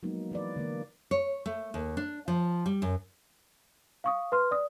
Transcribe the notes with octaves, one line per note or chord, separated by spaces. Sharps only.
F3 F#3 G#3 A#3 B3 D#4
E3 B4 D5
D3 E3 A#3
C#5
A3
D#2
D4
F3
G3
F#2
F5 C#6 D#6
B4 C6 F6
D5 D#6